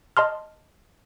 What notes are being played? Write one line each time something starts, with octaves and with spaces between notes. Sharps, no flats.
D#5 A5 C6 F6